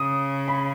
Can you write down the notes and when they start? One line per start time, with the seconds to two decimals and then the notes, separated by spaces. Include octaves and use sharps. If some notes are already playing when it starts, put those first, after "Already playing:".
Already playing: C#3 D#6
0.48 B5